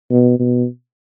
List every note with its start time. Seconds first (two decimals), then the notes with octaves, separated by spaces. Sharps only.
0.11 B2
0.39 B2